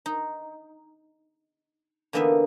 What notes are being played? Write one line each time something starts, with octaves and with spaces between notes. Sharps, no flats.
D#4
D3 E3 A#3 B3 D#4 E5